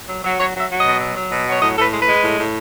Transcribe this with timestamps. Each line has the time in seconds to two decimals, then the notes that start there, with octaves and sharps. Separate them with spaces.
0.09 F#3
0.25 F#3
0.39 F#3 C#5
0.56 F#3 E5
0.70 F#3
0.81 B2 D#5
1.00 F#3
1.17 F#3
1.32 B2
1.47 F#3
1.52 C#5
1.62 A2 D#5
1.78 A2 A4
1.82 B4
1.93 G#3
2.02 B4
2.08 G#3
2.24 A2
2.39 A2